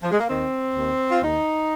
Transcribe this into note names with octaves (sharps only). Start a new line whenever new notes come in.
F3
G#3
A#3
D#2 D#3 C4
D#2 D#3
F4
D#2 D#3 D#4